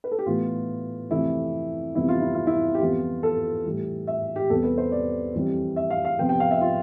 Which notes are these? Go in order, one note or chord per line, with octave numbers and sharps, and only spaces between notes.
B4
A4
G4
A2 E3 B3 F4
F2 C3 E3 A3 C4 E4
F2 C3 E3 G3 B3 E4
F4
E4
F4
E4
G4
F2 E3 G3 B3 F4
A4
A2 E3 G3
E5
G4
E2 C3 G3 B3 A4
B4
C5
D5
F2 E3 G3 C4
E5
F5
F5
F2 C3 F3 B3 G5
G5
F5
E5
F4